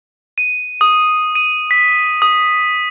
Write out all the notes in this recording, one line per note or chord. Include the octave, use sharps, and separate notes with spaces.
D#7
D#6
D#7
B6
D#6